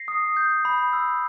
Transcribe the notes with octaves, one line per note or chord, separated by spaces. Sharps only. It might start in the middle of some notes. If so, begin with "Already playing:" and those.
Already playing: A#6 C7
D#6
G6
B5
E6